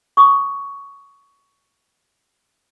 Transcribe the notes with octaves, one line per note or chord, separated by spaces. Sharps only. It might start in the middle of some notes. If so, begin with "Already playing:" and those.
C#6 D#6